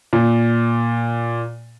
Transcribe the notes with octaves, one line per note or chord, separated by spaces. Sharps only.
A#2